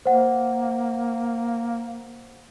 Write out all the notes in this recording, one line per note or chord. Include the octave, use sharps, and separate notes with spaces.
A#3 C5 F#5